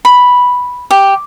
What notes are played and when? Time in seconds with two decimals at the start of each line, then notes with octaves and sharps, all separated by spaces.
0.05 B5
0.91 G4